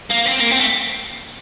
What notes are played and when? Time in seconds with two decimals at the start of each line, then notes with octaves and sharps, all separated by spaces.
0.11 A#3
0.27 C4
0.41 A#3
0.51 C4
0.60 A3